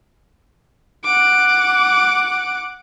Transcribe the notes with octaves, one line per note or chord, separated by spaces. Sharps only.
F#5 D6